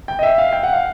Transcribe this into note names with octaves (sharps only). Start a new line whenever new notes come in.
G5
D#5
E5
F5
G5
F#5
F5